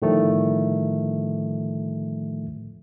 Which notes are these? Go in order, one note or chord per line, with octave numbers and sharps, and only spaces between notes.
A2 D3 D#3 F3 G3 A3